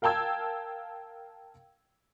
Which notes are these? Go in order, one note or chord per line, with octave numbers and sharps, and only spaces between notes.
A#4 F5 G5 A5 E6 G#6